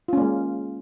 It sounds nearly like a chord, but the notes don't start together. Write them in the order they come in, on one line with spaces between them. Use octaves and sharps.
F4 C#4 A#3 G#3